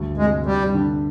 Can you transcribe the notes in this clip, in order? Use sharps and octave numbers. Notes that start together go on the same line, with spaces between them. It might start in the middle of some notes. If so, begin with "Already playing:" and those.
Already playing: D2 G2
C3 G#3
G2 G3
D3